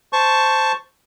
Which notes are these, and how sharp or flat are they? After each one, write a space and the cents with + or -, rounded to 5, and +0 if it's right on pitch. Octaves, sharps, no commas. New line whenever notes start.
C5 -5 A5 +0 C#6 +0